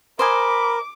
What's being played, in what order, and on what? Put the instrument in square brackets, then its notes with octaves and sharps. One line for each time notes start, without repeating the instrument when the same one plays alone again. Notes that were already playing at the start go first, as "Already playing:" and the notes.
[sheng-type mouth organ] A#4 [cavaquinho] C5 D#5 G#5 [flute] B5 [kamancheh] D6